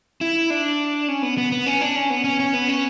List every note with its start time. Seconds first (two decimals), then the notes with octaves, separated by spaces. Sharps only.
0.21 E4
0.50 D4
1.08 C#4
1.22 B3
1.38 B3
1.52 B3
1.66 C#4
1.81 D4
1.96 C#4
2.10 B3
2.24 C#4
2.40 C#4
2.53 B3
2.68 C#4